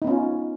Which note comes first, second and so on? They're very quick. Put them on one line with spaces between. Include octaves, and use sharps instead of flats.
D#4 B3 C#4 F4